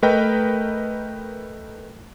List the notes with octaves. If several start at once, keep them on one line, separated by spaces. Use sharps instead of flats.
A3 A#4 B4 D#5 G5